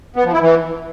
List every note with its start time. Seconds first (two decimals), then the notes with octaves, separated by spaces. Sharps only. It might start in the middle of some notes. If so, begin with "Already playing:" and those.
0.16 B3
0.24 F3
0.32 E4
0.41 E3